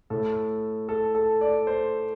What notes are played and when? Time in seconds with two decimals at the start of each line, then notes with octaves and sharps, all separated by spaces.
0.10 A2 A4
0.89 A4
1.15 A4
1.41 D5
1.67 C5